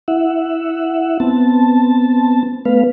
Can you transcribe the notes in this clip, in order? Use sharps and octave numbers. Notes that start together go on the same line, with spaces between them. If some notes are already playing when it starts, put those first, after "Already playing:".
E4 E5 F#5
B3 C4 A5
A3 B3 B4 F5